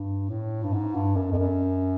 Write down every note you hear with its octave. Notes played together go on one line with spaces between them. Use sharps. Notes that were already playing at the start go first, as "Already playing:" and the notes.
Already playing: G2
A2
G2
G#2
G2
F#2
F2
F#2